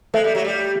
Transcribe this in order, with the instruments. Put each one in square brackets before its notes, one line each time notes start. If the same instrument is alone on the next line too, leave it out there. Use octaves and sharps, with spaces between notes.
[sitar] G#3 [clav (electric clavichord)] A3
[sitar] G3
F#3
G3